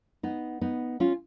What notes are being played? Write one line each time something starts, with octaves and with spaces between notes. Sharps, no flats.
B3 D#4
B3 D#4
C#4 F4